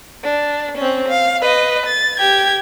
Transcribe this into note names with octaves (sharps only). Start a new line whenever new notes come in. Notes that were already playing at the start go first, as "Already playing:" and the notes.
D4
C4 C#4
F5
B4 D#5
A6
G4 G#6